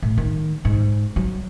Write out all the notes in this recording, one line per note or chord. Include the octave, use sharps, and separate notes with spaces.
A2
D#3
G#2
F#3